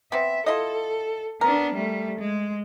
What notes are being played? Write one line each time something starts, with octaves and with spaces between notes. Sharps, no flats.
B3 C4 E5
E4 F4 A4 D#5
B3 D4 A#4
G3 A3
G#3